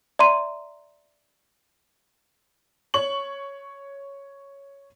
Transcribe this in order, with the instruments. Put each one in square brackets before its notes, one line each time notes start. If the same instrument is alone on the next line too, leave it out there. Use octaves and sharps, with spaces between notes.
[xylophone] D5 E5 A#5 C6 D#7
[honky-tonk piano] C#5 C#6 F#7